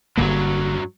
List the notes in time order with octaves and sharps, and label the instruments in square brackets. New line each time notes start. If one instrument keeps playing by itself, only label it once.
[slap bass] G1 D3 A#3 [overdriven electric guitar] G2 F#3